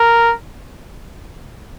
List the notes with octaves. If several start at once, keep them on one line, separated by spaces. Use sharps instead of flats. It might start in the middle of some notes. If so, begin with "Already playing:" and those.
Already playing: A#4